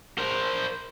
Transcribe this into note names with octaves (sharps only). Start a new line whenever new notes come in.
A#4 C5